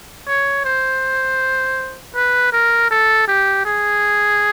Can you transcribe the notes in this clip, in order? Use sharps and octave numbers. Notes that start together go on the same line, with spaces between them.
C#5
C5
B4
A#4
A4
G4
G#4